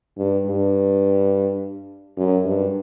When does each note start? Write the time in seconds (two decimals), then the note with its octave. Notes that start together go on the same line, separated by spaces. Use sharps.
0.18 G2
0.47 G2
2.17 F#2
2.45 G2